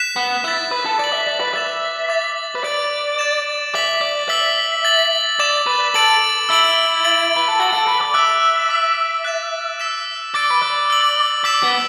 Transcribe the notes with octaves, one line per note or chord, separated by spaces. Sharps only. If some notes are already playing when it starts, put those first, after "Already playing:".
Already playing: F#6 B6 E7
B3
E4 A6 E7
B4
A4
D5 A6 F#7
E5
D5
B4
E5 D6 A6 E7
D6 A6 E7
B4
D5 A6 D7 F#7
A6 E7
E5 D6 B6 F#7
D5
E5 E6 B6 F#7
A6 F#7
D5 D6 A6 E7
B4
A4 A6 D7 F#7
E4 E6 D7 F#7
A6 D7 F#7
B4
A4
F#4 A6 D7 F#7
A4
B4
D5
E5 D6 F#6 D7 F#7
D6 B6 F#7
F#6 A6 E7
E6 B6 E7
D5 E6 A6 D7
B4
D5
E6 D7 F#7
D5 E6 B6 E7
B3